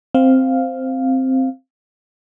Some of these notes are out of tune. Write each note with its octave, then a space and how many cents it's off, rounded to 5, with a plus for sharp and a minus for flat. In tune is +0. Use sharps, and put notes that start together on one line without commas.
C4 +0 F5 +0